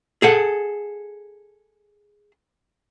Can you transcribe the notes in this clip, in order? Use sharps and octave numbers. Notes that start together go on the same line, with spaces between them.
G#4 A4 F#5